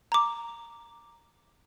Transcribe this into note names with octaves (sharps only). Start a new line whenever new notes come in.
A#5 D6